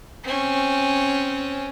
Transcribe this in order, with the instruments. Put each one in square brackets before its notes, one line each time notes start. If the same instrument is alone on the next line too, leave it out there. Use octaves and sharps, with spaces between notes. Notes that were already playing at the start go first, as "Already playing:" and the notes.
[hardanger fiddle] C4 C#4